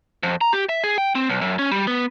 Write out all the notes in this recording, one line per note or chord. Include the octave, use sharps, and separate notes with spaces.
F2
A#5
G4
E5
G#4
G5
C4
B1
F#2
C#4
G3
B3